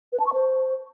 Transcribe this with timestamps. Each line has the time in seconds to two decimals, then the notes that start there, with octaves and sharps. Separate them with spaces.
0.12 B4
0.19 A5
0.26 C#6
0.33 C5